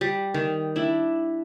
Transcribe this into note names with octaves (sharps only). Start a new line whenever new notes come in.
G3
D#3
D4 E4